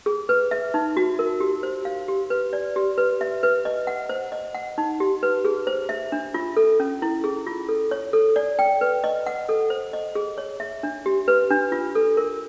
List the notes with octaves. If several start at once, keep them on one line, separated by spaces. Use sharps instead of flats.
G#4
B4
E5
D#4
F#4
A#4
G4
C5
F5
G4
B4
D5
G4
B4
E5
B4
D#5
F#5
C5
D#5
F#5
D#4
G4
B4
G#4
C5
E5
D4
F4
A4
C#4
E4
G#4
F4
A4
C#5
A4
D5
G5
B4
D#5
F#5
A4
C5
D#5
G#4
C#5
E5
D4
G4
B4
D4
F4
A4
A#4